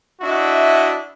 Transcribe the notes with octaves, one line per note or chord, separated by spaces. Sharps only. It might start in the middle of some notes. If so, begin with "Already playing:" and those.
D4 E4 F#4 D#5 E5